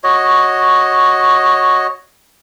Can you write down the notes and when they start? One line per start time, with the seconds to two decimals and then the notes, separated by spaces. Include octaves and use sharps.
0.04 F#4 C#5 D#5